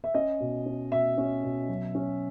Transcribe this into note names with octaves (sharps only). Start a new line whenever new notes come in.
E5
C#4 D#5
B2
C#4
B2 E5
C#4
B2
F#3
C#4